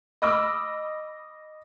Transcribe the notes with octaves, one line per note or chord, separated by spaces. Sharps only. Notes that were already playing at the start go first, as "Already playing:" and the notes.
D#5 B5 D6 E6 F6